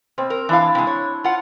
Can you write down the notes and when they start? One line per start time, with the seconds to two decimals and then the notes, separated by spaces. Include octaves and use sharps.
0.18 B2 C4
0.30 A#4
0.49 E3 D4 E4 F5
0.75 C3 G#3
0.87 C#5
1.24 F4 F#5